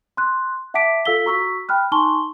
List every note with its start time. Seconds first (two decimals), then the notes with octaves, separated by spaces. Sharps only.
0.17 C6 F#6
0.74 E5 F#5 A5 D6 B6 D7
1.05 F4 A4 F5 E6 B6 G7
1.25 F#4 A#5 C#6 E6 B6
1.69 G5 B5 F6 F#6
1.92 D#4 G#5 A5 C6 C#6 G7